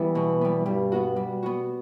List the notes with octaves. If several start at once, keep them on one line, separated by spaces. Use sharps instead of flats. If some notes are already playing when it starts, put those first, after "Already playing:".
Already playing: E3 G3 B3
B2
G3 B3
G2 G3
B3 F#4
G3
B3 F#4